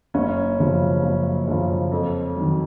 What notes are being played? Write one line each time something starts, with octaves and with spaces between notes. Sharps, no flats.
F#1 C#4
F#2 C#3 F3
F#1
F#2 C#3 F3
F2
D#3 F#3